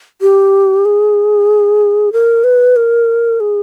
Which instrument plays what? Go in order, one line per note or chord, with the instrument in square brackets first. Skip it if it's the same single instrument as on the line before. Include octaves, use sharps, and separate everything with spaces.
[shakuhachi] G4
G#4
A#4
B4
A#4
G#4